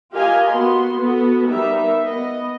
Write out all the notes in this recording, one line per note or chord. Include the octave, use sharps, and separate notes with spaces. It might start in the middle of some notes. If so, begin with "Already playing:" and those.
F4 G4 A#4 D#5 F5 G#5
B3 F#4 C6
B3 F#4 A4
G3 B3 D#4 A#4 E5
B3 D#5